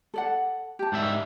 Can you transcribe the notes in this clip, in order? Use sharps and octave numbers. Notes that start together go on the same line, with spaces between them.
A4 D5 F#5
G4 A5
G#2 G3 E5